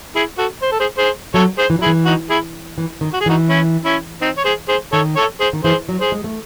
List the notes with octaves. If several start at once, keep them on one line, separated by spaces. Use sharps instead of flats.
E4 G#4
F#4 A4
C5
A4
G#4 C5
G#4 C5
F#3 A4 C#5
G#4 C5
E3
F#3
E4 G#4
E3
D#4 F#4
E4 G#4
E3
D#3
F#4
G#4
E3 D#4 F#4
C#4 E4
C#4 E4
C4 D#4
C#5
G#4 C5
G#4 C5
D#3 A4 C#5
A4 C#5
G#4 C5
D#3
E3 G#4 C5
F#3
G#4 C5
G#3
A3